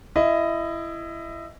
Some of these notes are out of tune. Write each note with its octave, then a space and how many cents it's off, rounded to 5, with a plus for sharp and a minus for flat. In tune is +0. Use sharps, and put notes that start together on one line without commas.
E4 +20 D#5 +0